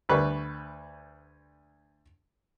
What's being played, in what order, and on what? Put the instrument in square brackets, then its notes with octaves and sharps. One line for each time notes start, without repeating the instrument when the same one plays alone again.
[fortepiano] D2 G3 B4 C#6